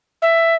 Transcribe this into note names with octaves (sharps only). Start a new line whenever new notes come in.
E5